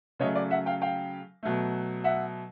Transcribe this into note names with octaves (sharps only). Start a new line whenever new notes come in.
C#3 F#3 A3 C#5 D#5
D5
E5 F#5
F5 G5
F5 G5
B2 F#3 A3
E5 F#5